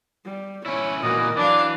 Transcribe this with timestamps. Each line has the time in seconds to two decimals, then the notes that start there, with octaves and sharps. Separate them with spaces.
0.25 G3
0.66 C#4 E4 C#5
1.03 A#2 E3 F#4 A#4 D#5
1.37 E3 F#3 D4 D5 F5